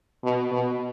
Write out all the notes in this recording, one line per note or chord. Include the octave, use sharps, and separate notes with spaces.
B2
B2